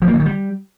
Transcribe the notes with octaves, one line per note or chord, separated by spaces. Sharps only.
F3
A#3
E3
D#3
G3